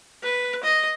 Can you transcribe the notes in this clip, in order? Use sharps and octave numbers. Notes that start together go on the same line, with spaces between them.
B4
D#5